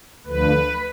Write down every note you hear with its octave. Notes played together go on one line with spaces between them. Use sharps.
D2 D3 F3 B4